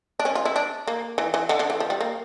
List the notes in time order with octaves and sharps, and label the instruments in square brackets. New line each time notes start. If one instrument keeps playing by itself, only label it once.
[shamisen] D4
C#4
F4
E4
D4
A#3
E3
E3
D3
D3
E3
F3
G3
A#3